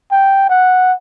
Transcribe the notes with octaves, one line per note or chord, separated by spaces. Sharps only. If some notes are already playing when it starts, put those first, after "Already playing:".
G5
F#5